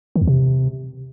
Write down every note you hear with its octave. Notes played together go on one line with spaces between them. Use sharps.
D#3
E2
C3